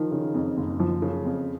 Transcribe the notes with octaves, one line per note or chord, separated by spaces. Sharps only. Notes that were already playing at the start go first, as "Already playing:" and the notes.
Already playing: D#3 F3
C#3
F2
F#1
F3
C#3
F2